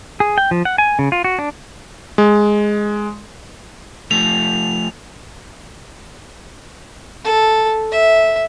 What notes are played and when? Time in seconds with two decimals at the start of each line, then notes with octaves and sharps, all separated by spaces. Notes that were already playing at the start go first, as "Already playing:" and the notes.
0.20 G#4
0.38 G5
0.51 F3
0.65 F#5
0.78 G#5
0.99 C#3
1.12 F4
1.24 F#4
1.39 D4
2.18 G#3
4.11 F3 A3 F7
7.24 A4
7.92 E5